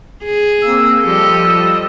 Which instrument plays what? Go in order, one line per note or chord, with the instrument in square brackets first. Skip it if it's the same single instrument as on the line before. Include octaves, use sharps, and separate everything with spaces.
[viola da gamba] G#4
[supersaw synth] A#3 C4 [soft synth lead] E6
[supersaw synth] F3 G3 D#5 [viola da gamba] G4 A4